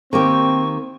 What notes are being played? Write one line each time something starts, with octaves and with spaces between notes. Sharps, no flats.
D#3 A#3 C4 G4 C#6